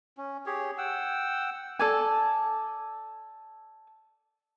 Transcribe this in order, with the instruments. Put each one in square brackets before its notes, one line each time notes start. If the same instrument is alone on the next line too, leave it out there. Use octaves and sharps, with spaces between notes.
[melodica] C#4
G4 G#4 C#5
F#5 G5 E6
[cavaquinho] A4 D5 G#5